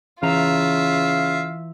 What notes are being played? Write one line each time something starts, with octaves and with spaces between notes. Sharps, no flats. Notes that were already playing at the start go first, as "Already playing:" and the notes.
C#3 E3 F4 E5 F5 A#5